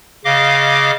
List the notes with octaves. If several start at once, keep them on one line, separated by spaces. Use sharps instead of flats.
C#3 D#5 F5 D6